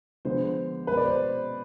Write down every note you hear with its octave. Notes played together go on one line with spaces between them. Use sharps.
D3 F3 G#3 B3 C5
B2 G#3 B3 B4
D5
C5